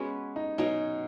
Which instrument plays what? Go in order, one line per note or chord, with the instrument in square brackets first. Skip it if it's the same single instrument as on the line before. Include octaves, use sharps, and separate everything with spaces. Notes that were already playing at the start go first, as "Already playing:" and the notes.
Already playing: [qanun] G#3 B3 F#4 B4 [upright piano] C#4
[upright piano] D#4
[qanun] B2 F#3 C#4 F#4 [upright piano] D#4